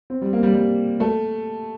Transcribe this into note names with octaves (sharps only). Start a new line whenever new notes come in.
C4
G3
A#3
G3
G3
A3